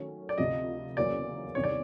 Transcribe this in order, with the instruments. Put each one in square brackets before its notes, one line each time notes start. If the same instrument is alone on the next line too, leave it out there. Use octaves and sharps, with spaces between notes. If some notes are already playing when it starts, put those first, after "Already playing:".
Already playing: [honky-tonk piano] D#3 F#3 A3 C#4
[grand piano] D5
[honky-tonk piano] D2 C3 F3 [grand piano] D#5
[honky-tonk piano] E2 C#3 F#3 A#3 C#4 [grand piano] D5
[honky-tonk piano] E2 C3 D#3 G3 [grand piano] C#5
[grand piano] D5